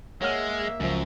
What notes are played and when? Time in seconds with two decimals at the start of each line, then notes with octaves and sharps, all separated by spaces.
0.21 G#3 A#3 C#5 E5 F#5 F6
0.80 C#2 F#2 F3